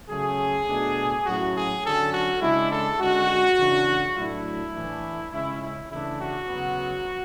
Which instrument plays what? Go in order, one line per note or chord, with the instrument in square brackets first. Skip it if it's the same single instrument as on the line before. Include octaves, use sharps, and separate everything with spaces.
[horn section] C#3 F#3 A3 C#4 G#4
B2 A3 D4
A2 F#3 C#4 F#4
G#4
D3 F#3 C#4 A4
F#4
C#3 G#3 D4 E4
A4
D3 G#3 C#4 F#4
C#3 E3 A3 D4
A2 F#3 A3 D4 E4
A2 E3 A3 D4
C#3 G#3 C#4 E4
E4
C#3 E3 A3 D4 E4
F#4
C#3 F#3 B3